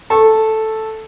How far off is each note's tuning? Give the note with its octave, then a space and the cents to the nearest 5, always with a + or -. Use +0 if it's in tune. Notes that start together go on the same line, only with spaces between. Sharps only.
A4 +0 C#6 -20